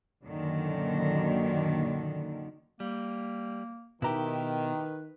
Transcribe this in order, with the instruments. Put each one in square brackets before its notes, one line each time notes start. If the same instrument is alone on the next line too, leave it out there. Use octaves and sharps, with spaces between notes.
[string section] F#2 A#2 D3 D#3
[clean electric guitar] G3 [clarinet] A#3
[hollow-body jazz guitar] B2 A#5 [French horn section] D#3 [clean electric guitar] E4 G4 [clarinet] B4